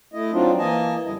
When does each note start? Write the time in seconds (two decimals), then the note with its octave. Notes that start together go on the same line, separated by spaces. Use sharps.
0.13 A3 E4 D#5
0.32 F#3 C4 D4 D#4 F4
0.58 E3 A#3 D#5 G#5 A5
1.05 F2 D3 G3 E4 D#5